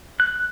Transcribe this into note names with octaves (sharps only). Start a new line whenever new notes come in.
F#6